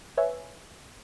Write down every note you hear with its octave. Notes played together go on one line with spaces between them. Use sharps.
B4 C#5 E5 G#5